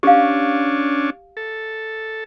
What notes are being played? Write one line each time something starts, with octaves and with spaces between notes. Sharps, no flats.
C#4 D4 G4 F5
A4